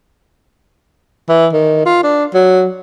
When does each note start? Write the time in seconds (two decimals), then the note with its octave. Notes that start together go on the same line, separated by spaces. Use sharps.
1.29 E3
1.53 D#3
1.86 F4
2.03 D4
2.34 F#3